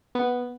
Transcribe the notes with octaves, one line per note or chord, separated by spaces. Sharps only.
B3